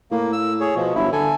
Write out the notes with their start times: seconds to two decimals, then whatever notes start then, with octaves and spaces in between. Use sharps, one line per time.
0.12 A2 A#3
0.33 E6
0.60 G#4 C#5
0.75 B2 F3
0.95 G1 F#3 E4
1.12 D3 A4 G#5